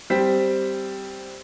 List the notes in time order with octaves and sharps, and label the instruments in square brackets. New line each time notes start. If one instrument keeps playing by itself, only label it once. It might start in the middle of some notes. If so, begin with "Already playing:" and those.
[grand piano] G3 C4 B6